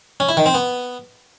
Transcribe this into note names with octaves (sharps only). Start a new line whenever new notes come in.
C#4
E4
D#3
C4
B3